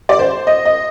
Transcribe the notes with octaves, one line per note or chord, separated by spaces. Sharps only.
D5
C5
D#5
D#5